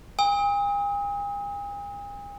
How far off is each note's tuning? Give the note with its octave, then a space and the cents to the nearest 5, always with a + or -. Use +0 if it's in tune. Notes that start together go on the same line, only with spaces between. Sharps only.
G#5 -45 D#6 +40